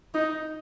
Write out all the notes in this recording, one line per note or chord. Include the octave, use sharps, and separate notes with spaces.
D#4